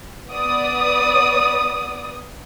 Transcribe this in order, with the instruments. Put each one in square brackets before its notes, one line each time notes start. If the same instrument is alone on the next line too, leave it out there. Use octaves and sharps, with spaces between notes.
[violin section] B3 D5 D#6